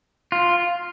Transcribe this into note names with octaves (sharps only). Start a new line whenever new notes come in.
F4